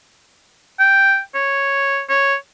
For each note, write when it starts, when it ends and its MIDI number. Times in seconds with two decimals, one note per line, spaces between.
0.80 1.20 79
1.35 2.02 73
2.09 2.35 73